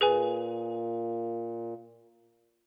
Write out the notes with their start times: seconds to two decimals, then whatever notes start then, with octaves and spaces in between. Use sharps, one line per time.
0.01 A#2 G#4 B4 G#5